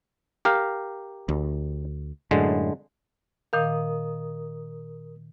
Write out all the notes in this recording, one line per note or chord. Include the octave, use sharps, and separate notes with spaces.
G4 A#4 F5
D2
F#2 A2 D3 G#3
A#2 D#3 A#4 F5 D#6